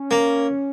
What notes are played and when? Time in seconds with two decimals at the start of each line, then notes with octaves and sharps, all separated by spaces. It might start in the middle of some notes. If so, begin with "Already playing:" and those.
Already playing: C#4
0.11 A#3